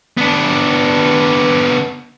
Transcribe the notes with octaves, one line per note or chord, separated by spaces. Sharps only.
B3 D4